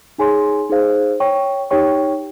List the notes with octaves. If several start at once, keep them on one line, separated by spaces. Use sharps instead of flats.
D#4 G#4 C#5 G#5 C6
D#4 G#4 C5 F5
C#5 G5 C#6
D#4 G4 C#5 G5 C#6